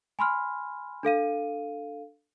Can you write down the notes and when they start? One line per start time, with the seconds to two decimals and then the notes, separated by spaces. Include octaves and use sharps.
0.19 G#5 B5 C6 F6
1.03 D4 A4 F5 D#7